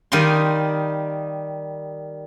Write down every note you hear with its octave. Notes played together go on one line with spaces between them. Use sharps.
D#3 G3 D#5 F5 C6